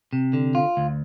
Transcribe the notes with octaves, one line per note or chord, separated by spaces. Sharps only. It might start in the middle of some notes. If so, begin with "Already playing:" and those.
C3
D3
F4
D2